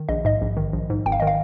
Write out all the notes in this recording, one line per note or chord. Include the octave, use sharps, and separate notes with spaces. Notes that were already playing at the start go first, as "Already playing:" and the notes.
Already playing: D#3
A#1 D#5
G#2 D#5
A#1
D#3
A#1
G#2
G#1 G5
F5
D#3 D#5
F5